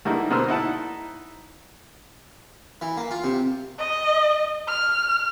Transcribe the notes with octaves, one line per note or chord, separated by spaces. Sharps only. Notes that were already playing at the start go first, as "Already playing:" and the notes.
G2 D3 G3 A#3 D#4 E4
B2 A#3 A#4 C5 E6
D#4 E4 F#5 A5
E3
A#3
F4
C3
D#5
F6